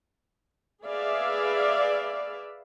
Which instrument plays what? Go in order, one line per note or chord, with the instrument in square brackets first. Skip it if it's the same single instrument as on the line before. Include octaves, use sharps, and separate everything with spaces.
[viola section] G#4 B4 D5 E5 F5